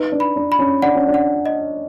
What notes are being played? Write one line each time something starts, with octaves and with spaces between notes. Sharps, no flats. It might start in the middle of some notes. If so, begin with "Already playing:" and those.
Already playing: D#4 B4
D4
B5
D4
B5
C#4
D4 F#5
C#4
D4
F#5
D#5